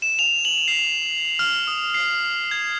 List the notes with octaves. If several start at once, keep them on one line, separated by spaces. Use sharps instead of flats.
E7
F7
F#7
C7
F6
D#6
C7
G#6